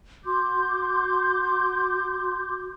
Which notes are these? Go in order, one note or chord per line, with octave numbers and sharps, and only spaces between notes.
F#4 C6 D6 G6